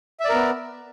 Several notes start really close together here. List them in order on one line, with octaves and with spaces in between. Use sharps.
E5 D5 A#4 B3